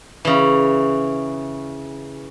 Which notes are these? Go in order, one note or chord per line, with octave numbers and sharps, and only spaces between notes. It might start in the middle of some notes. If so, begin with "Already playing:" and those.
C#3 E3